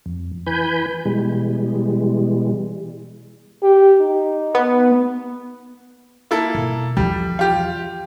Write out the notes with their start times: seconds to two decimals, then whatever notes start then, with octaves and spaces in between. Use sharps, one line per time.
0.06 F2
0.47 E3 B4 G#5 B5 G6
1.05 B2 E3 G3 G#3
3.63 G4
4.01 D#4
4.55 B3
6.31 A#3 E4 A4
6.55 B2
6.97 E2 F3 G3
7.39 F4 G4